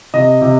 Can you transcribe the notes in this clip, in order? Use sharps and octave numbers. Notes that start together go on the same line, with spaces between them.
C3 D#5
C3